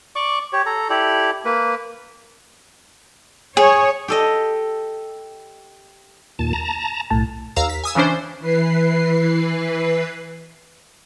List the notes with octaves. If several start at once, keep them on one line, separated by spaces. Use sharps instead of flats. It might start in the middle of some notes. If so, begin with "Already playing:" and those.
D5 C#6 D6
G4 C#5
A4 A#5
E4 G4 A4 D5
A#3 B4
G#4 C#5
G4 A4 D#5
D#2 A#2 A5
A5 A#5
B1 A2 A5
D#2 F5 A#5 E6
B6
G#5 D#6 E6
C#3 E3 C#4 D4 C5
E3 B4 C7